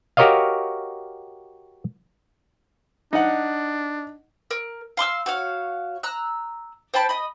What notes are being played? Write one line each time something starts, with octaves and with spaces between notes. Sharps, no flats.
F#4 G4 A#4 C#5 D#5 F5
D4 D#4 F#5
A#4
F5 C6 D#6 E6
F#4 C#5 F5
A#5 E6 F#6
C5 G5 A5 B5
D#5 B5